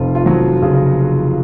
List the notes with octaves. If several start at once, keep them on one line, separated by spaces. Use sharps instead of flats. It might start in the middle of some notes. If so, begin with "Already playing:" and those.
Already playing: F1 F3 F4
F4
F3 F#3 F#4
C#3